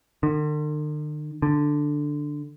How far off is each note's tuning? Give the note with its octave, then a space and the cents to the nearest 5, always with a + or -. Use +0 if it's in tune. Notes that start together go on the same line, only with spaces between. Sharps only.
D3 +45
D3 +5